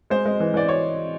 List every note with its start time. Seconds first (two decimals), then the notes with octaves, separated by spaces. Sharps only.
0.10 G#3 C5
0.25 G#3
0.40 E3
0.54 E3 D5
0.69 C#5